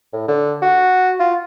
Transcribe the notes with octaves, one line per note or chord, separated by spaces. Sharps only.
A2
D3
F#4
F4